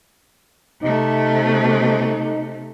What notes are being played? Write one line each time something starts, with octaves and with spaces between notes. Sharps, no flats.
C3 A3 D#4